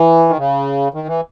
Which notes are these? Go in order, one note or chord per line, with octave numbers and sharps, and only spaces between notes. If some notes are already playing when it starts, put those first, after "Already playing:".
Already playing: E3
D#3
C#3
D#3
E3